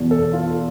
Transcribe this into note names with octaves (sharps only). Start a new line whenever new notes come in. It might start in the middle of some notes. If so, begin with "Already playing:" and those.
Already playing: E2 B2
A4
F4